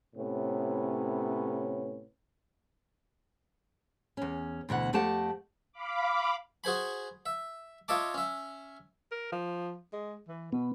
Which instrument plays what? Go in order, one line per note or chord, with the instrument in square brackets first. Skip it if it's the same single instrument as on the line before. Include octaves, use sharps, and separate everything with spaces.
[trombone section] A2 C3 B3 C#4
[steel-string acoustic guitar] E2 C#4
D2 B2 E3 F#5
F2 A3 G4 D#5 F#5 A5
[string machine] F5 B5 D6
[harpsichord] F#4 G#4 C5 G#5 B5
E5
F4 C#5 D#5 E5 A5 D6
C#4 E5
[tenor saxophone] A#4
F3
G#3
E3
[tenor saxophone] B2 [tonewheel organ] B3